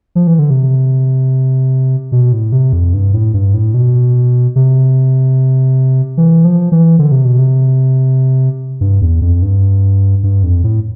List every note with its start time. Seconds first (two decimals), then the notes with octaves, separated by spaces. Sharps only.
0.15 F3
0.27 E3
0.39 D3
0.50 C3
2.12 B2
2.32 A2
2.52 C3
2.73 F2
2.93 G2
3.14 A2
3.34 G2
3.54 A2
3.74 B2
4.56 C3
6.17 E3
6.45 F3
6.72 E3
6.99 D3
7.12 C3
7.25 B2
7.38 C3
8.81 G2
9.01 E2
9.21 F2
9.42 G2
10.23 G2
10.43 F2
10.64 A2